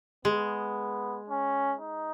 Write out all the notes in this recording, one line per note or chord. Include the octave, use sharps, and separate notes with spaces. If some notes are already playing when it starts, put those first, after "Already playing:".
G#3 B3
C#4
D#4